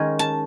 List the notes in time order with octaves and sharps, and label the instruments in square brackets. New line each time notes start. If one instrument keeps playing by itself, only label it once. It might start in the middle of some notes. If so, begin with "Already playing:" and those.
Already playing: [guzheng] D#3 G#3 C#4 G#5
A5